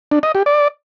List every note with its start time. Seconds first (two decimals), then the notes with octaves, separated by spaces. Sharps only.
0.12 D4
0.23 D#5
0.35 G4
0.46 D5